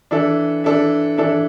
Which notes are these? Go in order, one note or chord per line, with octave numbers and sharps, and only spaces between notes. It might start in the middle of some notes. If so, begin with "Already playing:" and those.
E3 D4 A4 E5
E3 D4 A4 E5
E3 D4 A4 E5